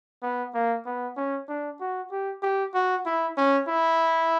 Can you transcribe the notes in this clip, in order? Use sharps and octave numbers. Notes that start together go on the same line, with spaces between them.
B3
A#3
B3
C#4
D4
F#4
G4
G4
F#4
E4
C#4
E4